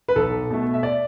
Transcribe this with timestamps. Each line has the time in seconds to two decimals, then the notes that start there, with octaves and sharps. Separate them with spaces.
0.08 B4
0.16 B1 A4
0.50 B2 A3
0.74 E5
0.83 D5